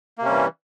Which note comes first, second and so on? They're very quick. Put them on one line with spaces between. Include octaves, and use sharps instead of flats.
A#3 C3 C#4 G3 E3